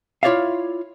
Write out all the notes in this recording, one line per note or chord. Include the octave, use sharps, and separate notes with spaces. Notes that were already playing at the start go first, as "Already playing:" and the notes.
E4 F4 C#5 D5 E5 F5